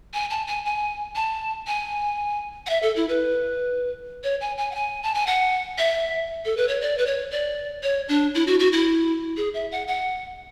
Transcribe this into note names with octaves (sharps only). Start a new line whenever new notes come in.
G#5
A5
G#5
G#5
A5
G#5
F#5
E5
A4
E4
B4
C#5
G#5
G#5
F#5
G#5
A5
G#5
F#5
E5
A4
B4
C#5
D5
B4
C#5
D5
C#5
D4
E4
F#4
F#4
E4
G#4
E5
F#5
F#5